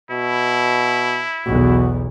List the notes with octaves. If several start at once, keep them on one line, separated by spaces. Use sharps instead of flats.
B2 E4
B1 E2 F#4